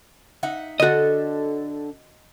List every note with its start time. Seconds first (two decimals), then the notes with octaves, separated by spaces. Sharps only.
0.43 D#4 E5 F#5
0.80 D3 F#4 A4 D#5